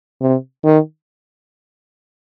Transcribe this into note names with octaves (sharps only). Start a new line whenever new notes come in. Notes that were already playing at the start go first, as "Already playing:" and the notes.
C3
D#3